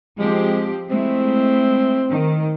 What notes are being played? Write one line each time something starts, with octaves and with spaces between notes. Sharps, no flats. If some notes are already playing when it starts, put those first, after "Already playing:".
F3 G#3 C4 G4
G#3 A3 C4 E4
D#3